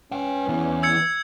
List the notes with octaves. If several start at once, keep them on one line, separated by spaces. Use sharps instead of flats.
C#4 B4 G5
E3 B3
E6 G#6 C#7